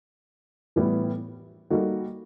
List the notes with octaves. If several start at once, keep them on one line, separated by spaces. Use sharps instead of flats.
A2 E3 G3 B3 E4
G3 A#3 D#4 F#4 A4